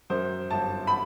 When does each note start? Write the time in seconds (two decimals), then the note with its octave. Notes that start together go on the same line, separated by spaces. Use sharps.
0.10 F#2 C5
0.50 G1 A5
0.87 B5